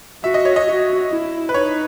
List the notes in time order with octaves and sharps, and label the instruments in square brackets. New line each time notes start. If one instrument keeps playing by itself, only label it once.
[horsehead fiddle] F#4 [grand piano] E5
[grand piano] D#5
C#5
D#5
[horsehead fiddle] F#4
E4
[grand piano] B4
[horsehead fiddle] D#4 [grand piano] C#5